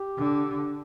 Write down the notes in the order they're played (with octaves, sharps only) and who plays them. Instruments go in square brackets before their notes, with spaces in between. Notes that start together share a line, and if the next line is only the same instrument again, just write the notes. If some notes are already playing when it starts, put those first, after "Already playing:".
Already playing: [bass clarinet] G4
[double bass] D3